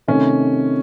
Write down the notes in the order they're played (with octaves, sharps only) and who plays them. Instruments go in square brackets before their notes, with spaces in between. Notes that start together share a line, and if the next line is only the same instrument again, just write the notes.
[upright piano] C3 D#3 A3 C#4